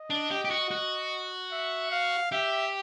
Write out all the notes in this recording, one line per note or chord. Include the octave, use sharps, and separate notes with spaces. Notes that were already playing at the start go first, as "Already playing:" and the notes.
Already playing: D#5
D4
G4
G4
F#4
F#4
E5
F5
G4 E5